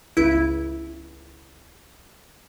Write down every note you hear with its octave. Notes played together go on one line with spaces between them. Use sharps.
G1 C#2 E4